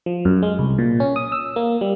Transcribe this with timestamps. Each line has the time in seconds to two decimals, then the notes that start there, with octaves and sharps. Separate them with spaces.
0.06 F3
0.25 F#2
0.43 G#3
0.59 C2
0.78 A#2
1.00 C#4
1.16 D#6
1.32 E6
1.56 A#3
1.81 G3